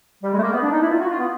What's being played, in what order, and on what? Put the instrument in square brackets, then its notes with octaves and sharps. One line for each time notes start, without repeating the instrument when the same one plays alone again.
[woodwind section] G3
G#3
A3
A#3
B3
D4
D#4
E4
F4
F#4
F4
B3